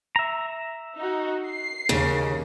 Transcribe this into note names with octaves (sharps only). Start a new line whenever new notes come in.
E5 A#5
D#4 F#4
C7
D#2 C#3